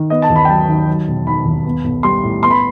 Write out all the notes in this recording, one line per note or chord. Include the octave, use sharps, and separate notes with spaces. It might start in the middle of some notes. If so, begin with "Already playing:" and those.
Already playing: D#3
B3 D#5
A5
D#2
B5
G5
F#3 A5
D#3
F#3
E1
D#3 B5
D#2
B3
B1
G3 C6
A2
B3 C6
B5